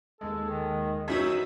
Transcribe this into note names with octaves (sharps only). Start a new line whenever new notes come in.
D#2 G#3 A4
D#3
F#2 E3 F#3 D#4 E5 B5 D#6